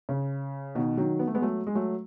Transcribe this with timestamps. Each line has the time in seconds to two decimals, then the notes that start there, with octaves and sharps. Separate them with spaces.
0.09 C#3
0.75 B2 D#3
0.97 D#3 F#3
1.19 B3
1.27 A3
1.35 G#3 B3
1.42 F#3 A3
1.67 G#3
1.75 F#3 A3